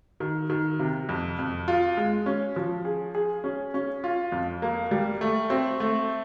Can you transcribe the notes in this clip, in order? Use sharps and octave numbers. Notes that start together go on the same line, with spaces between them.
D#3
D#3
C3
F2
F2
F4
G#3
C#4
F3
G#4
G#4
C#4
C#4
F4
F2
A#3
G3
A3
C4
A3